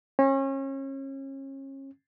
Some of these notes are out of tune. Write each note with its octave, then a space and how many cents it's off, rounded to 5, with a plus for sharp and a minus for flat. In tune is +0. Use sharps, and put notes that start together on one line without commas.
C#4 -35